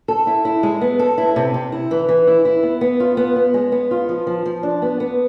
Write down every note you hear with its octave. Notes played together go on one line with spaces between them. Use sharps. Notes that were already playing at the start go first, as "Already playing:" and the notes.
A4
E4
E4
G#3
B3
A4
E4
C3
C3
E4
E3
E3
E4
E4
B3
B3
F4
B3
B3
G#3
B3
F4
F3
F3
F3
D4
B3
B3